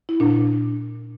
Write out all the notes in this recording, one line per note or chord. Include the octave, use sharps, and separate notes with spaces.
E4
A#2 D4